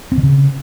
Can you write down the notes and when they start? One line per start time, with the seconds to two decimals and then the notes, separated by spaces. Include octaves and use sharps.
0.12 C4
0.17 D3
0.23 C#3